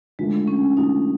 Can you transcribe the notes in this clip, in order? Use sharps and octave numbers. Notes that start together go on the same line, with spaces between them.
D3 F3 G#3 A3
C#4
D3 F3 A3 D#4